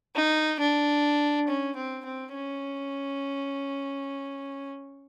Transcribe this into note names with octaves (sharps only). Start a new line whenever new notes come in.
D#4
D4
C#4
C4
C4
C#4